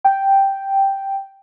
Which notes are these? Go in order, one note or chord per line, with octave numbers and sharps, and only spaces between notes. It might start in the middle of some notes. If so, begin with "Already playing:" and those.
G5